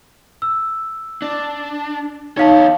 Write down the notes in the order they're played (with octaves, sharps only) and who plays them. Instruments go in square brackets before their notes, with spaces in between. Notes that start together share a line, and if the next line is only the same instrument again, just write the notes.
[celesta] E6
[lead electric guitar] D4
[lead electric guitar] E2 C#5 [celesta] D#4 F5 A5